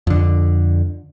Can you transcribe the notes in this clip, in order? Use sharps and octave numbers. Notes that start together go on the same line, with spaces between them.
F2 D3